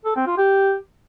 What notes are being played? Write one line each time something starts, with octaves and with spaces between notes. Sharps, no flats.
A4
C4
F4
G4